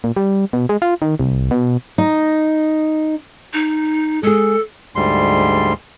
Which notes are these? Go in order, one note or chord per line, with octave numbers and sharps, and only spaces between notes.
A#2
G3
B2
G#3
F4
D#3
C2
B2
D#4
D#4
G#3 G#4 A4
D2 G#2 G3 C6